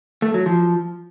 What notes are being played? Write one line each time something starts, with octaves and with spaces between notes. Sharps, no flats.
A3
F#3
F3